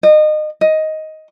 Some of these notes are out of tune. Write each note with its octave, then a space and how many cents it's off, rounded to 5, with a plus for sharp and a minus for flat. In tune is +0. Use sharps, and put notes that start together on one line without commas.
D#5 -30
D#5 +10